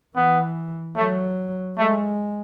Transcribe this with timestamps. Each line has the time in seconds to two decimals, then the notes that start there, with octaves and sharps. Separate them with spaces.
0.16 E3 B3
0.97 F#3 A3
1.78 G#3 A3